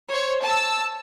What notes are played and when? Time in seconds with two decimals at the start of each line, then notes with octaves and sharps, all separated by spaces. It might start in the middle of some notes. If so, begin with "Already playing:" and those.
0.11 C5 C#5
0.44 A5 E6